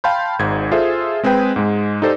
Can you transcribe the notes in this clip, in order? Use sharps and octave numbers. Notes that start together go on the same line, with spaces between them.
F5 G5 A5 B5 C6 G6
G#1 G#2 G#6
F4 G#4 A4 C5 E5
G#3 C4 G#4 B4 G5
G#2 G#3
D#4 G4 A4 C5 D5